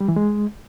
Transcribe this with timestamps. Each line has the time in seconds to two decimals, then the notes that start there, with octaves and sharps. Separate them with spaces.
0.01 G3
0.08 E3
0.16 G#3